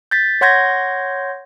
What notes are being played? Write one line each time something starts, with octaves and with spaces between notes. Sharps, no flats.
G6 A6 B6
C#5 F#5 C6 G6 G#6 A#6